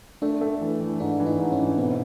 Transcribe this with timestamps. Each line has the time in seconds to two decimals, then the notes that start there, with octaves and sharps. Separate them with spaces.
0.22 A3 D4
0.41 A3
0.61 E3
0.80 E3
1.00 G#2 D4
1.20 E3
1.26 D#4
1.39 G#2
1.52 C#4
1.59 E3
1.78 B2 C4